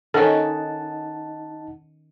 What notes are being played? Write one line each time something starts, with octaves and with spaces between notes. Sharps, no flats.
D#3 C#4 D#4 A4 F#5 A5